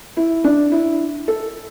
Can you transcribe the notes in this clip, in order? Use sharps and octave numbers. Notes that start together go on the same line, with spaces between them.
E4
D4
E4
A4